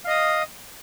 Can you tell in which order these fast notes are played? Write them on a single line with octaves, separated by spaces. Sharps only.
F5 D#5 D#6